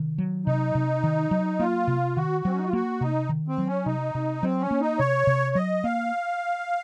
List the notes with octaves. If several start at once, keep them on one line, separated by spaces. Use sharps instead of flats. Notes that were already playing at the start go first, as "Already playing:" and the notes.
Already playing: C3 D#3
F#3
C3 D#4
C3
D#3
F#3
A#3 F4
C3
D#3 F#4
F#3 C4
C#4
D#4
F4
A#3 F#4
C3 D#4
D#3
C4
F#3
C#4
C3 D#4
C3
F#3 C4
C#4
A#3
D#4
C3 C#5
C3
F#3 D#5
A#3 F5